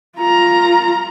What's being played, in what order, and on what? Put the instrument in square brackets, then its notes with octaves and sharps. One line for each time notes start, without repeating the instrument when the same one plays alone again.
[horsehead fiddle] F4 A#5